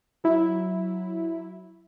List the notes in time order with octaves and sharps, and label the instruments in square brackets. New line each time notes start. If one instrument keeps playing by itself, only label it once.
[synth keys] F#3 E4